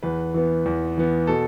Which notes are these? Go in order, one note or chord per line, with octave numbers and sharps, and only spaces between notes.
E2 B4
E3 B3
E2
E3 B3
B2 A4